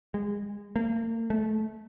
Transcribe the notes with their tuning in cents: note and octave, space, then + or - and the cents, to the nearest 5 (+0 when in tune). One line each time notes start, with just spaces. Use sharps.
G#3 -25
A#3 -40
A3 -20